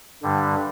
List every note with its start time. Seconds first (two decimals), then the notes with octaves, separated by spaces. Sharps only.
0.23 G2 D3 G3